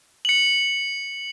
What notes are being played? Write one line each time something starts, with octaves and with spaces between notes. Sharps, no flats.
C#7 F#7